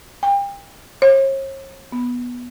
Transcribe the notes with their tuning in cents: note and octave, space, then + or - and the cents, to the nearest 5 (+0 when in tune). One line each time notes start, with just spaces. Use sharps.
G5 +35
C#5 -45
B3 -10